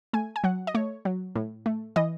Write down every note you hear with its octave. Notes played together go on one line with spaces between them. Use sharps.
A3 G#5
G#5
F#3 F#5
D#5
A3 C#5
F#3
A2
A3
E3 D#5